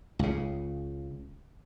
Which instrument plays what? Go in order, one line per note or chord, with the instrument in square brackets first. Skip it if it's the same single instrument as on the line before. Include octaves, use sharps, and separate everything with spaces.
[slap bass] C#2 C#3